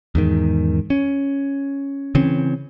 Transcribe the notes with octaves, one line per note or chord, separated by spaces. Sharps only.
E2 G#2 D#3
C#4
C#3 E3 C4 C#4